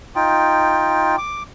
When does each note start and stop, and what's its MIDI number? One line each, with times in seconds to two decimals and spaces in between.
0.16 1.16 63
0.16 1.16 65
0.16 1.16 79
1.18 1.43 86